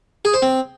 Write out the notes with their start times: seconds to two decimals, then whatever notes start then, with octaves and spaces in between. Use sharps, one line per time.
0.25 G#4
0.34 C5
0.42 C4